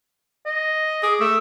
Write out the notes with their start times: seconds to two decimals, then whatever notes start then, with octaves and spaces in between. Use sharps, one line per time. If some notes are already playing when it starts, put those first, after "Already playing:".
0.46 D#5
1.03 G#4 D6
1.21 A3 E5